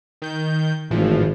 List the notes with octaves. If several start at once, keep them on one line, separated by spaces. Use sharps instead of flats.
D#3 G6
G#1 A2 E3 F3